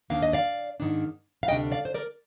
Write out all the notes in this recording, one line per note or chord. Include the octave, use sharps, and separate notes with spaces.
D#2 D#3 A#3 D4 F5
D#5
D5 F5
G#2 D#3 A#3 D4
F5
D2 C3 G3 D4 D#5 G5
D5 F5
C5
A#4 D5